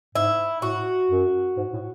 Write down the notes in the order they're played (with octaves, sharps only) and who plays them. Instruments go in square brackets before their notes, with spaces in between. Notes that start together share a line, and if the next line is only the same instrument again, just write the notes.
[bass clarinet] G#2 [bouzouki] E4
[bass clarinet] A2 [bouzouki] F#4
[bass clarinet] F#2
G#2
A2